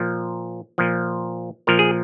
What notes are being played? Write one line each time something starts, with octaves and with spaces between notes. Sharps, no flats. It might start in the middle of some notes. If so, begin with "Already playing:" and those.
Already playing: A#2 F3
A#2 F3
A#2 F3 A#4
G#4